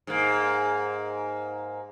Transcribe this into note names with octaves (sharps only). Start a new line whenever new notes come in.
G#2 A#3